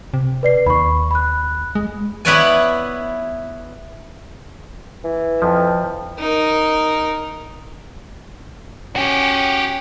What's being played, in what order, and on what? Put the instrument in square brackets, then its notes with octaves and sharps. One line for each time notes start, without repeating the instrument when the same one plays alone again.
[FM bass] C3
[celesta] B4 D5 C7
[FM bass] D#2 [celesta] B5 C#6
[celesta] B5 F#6
[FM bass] G#3
[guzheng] B3 E4 B4 C#5 D5 G#5
[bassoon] E3
[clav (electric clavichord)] F2 F3 E5
[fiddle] D#4 A#4
[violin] C#4 F#5 [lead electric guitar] F#4 G4